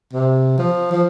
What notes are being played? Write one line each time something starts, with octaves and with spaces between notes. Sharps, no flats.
C3
F3
F3